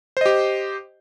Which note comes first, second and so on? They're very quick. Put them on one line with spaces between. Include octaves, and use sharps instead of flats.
C5 D#5 G4